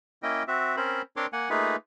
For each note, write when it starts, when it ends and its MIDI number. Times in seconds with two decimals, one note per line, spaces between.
0.23 0.43 58
0.23 0.43 61
0.23 0.43 64
0.23 0.43 75
0.23 0.43 79
0.48 0.76 60
0.48 0.76 66
0.48 0.76 76
0.77 1.02 60
0.77 1.02 61
0.77 1.02 70
0.77 1.02 72
0.77 1.02 83
1.16 1.26 60
1.16 1.26 62
1.16 1.26 70
1.16 1.26 73
1.16 1.26 84
1.16 1.26 86
1.33 1.49 58
1.33 1.49 78
1.33 1.49 80
1.50 1.76 57
1.50 1.76 58
1.50 1.76 63
1.50 1.76 65
1.50 1.76 68
1.50 1.76 71